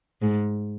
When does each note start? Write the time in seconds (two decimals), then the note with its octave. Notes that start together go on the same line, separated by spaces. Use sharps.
0.22 G#2